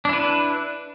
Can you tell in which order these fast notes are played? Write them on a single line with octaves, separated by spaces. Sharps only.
D4 E4 B4